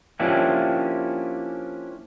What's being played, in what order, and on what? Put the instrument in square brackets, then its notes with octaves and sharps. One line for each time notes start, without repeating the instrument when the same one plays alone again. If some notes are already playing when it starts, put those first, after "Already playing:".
[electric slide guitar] F3 A#3 C#4 D4 E4 G4